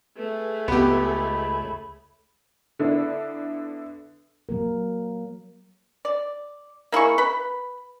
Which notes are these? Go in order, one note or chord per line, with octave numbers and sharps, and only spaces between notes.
A3 G#4 B4
C#2 B3 G4
B5
D3 B3 D4 E4
F#3 A#3 A#4
D5
A#3 E4 G#4 C#6
B4 B5